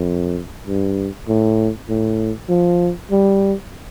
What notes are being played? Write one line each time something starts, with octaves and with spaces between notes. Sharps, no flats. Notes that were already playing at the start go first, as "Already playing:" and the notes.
Already playing: F2
G2
A2
A2
F3
G3